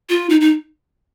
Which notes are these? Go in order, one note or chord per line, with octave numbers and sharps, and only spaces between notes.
F4
D#4
D#4